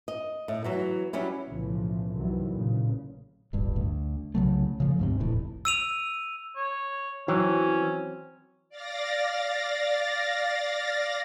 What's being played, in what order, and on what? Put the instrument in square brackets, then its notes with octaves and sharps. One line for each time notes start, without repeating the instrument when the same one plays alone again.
[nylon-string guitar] D#5
A2
E3 F#3 B3
F#3 G3 C#4 E4
[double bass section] B1 A2 C#3 E3 F3 A3
C2 G2 C3 D#3 E3 F#3
A1 A#2 C#3
[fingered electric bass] D1 G1 G2
D2
C2 C#3 F#3 A3
C#3 F3 A3
D2 G#2 C3
D#1 A1 A2
[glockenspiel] E6 D#7 F7
[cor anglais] C#5
[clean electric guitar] E3 [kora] F#3 C4 [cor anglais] C#4
[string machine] D5 F5 A6 A#6